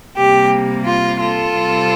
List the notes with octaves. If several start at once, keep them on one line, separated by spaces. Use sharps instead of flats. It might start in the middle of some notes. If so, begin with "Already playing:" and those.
C3 G3 A#3 G4
F4
F4 A4
C3 G3 C4